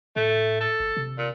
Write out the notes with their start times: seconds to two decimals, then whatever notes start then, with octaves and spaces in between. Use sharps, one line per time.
0.16 A2 A3
0.61 A4
0.80 G#1
0.97 C3
1.18 A#2